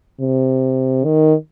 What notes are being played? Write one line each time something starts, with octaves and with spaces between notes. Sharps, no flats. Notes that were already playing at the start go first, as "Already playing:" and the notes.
C3
D#3